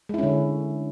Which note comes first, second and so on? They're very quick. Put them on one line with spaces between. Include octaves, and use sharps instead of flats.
G#3 E4 C#4 D3